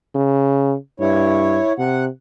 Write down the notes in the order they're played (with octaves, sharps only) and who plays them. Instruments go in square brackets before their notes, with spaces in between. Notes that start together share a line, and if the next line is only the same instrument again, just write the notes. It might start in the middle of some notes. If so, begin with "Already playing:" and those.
[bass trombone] C#3
[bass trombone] G2 [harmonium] E4 C#5
[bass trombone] C3 [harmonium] F#5